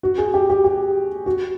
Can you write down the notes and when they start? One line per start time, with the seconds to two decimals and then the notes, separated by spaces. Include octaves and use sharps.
0.03 F#4
0.18 G#4
0.34 G4
0.50 G4
0.64 G4
1.26 F#4